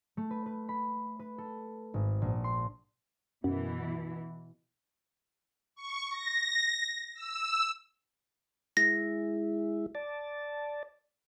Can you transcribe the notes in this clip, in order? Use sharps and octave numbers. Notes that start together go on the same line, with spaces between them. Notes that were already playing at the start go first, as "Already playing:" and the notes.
A3
B4
B4
B5
B4
A4
G#1
A#1
C6
F#2 B2 E3
C#6
A#6
E6
G#3 E4 A#6
D5 A5